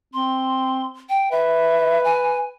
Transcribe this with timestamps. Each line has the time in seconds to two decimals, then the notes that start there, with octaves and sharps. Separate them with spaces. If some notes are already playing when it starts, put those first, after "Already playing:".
0.14 C4 C6
1.09 G5
1.31 B4 E5
2.04 G#5